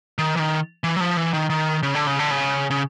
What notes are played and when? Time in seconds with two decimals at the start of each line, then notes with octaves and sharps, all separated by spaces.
0.18 D#3
0.36 E3
0.39 D#3
0.84 E3
0.96 F#3
1.00 F3
1.17 E3
1.33 D#3
1.50 D#3
1.83 C#3
1.95 D3
2.07 C#3
2.19 D3
2.31 C#3
2.70 C#3